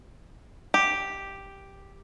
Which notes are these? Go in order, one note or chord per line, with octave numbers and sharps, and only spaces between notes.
G4